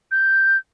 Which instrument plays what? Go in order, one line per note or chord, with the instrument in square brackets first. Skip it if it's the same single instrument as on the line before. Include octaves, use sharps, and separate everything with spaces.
[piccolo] G6